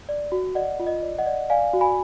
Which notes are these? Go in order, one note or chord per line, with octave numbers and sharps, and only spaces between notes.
D5
F#4
D5 D#5 F#5
F4
D#5
D5
D#5 F#5
D5
D5 F5 G#5
F#4
G#5 B5